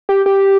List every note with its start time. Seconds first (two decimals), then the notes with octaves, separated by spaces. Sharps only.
0.09 G4
0.26 G4